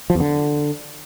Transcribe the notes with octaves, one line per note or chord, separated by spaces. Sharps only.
F3
E2
D3